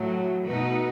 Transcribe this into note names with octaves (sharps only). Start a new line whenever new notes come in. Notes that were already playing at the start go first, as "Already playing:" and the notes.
Already playing: A2 F#3 A3
B2 A3 D#4 F#4 B4